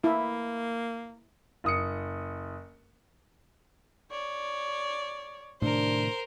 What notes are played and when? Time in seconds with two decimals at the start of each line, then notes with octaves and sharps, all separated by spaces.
0.04 A#3 E4
1.64 F#1 D#6 C#7
4.11 C#5 D5
5.62 A2 C3 D#3 D4 A#4 C5